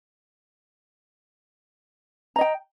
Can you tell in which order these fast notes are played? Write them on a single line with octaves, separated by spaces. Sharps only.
A#5 D#5 G5